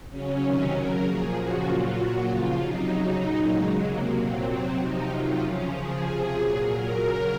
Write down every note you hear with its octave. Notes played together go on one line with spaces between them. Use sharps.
C#3 F#3 C#4
C3 D#3 F#3
C#3 F#3 A#4
A#2 F3 G#4
C#3 F3 F#4
A#2 F#3 F4
A#2 F#3 F#4
C#3 F3 F4
C3 F#3 D#4
C#3 F#3 D#4
A#2 F#3
C#3 F#3 G#3
C3 F#3 A#3
A#2 F#3 C4
C3 F#3
C3 F3 D#4
C3 D#3 F#3 F4
C#3 F3 C#4
C#3 F3 G#4
C3 F3
A#2 F#3
A#2 F#3 A#4
C#3 F#3